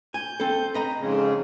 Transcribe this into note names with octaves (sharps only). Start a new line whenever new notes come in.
G#5 G6
C4 A4
B4 D#5 A#5
F2 G#2 C#3